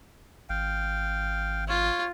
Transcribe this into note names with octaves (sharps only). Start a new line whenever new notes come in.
G#1 F5 G5
F4 C#5